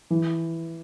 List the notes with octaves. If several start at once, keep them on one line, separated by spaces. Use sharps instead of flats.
E3